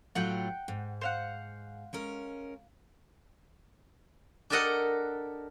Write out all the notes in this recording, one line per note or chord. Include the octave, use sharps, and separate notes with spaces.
A2 F#3 F4 F#5 G5
G#2
C5 F5 F#5
G#3 C#4 A#4
D4 G4 A4 A#4 D#5 F#5